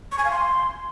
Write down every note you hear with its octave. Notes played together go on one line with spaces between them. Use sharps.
C#6
G#5
F5
C6